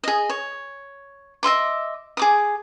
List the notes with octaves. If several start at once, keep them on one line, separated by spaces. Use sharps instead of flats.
G#4 D#5
C#5
D#5 E5 C6 D6
G#4 D6 D#6